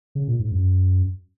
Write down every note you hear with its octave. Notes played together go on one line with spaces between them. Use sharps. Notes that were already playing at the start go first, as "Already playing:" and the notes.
C#3
A#2
G#2
F#2